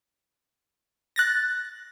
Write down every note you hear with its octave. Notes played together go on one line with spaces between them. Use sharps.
F#6 A6 A#6